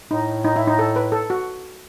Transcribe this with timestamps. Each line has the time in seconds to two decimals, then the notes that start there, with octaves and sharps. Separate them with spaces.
0.10 A2 D#4
0.45 D#4
0.56 E4
0.67 D#4
0.79 A4
0.96 B4
1.12 A4
1.30 F#4